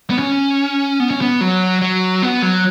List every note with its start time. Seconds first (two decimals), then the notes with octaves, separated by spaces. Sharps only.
0.10 B3
0.19 C#4
1.00 B3
1.11 C#4
1.21 B3
1.41 F#3
1.81 F#3
2.22 B3
2.42 F#3